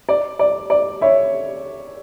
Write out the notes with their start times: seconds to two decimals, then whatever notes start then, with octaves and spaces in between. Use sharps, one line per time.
0.09 D5
0.39 D5
0.70 D5
1.01 C#5 E5